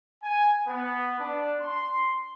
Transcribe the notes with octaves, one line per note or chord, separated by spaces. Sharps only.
G#5
B3
D4
C6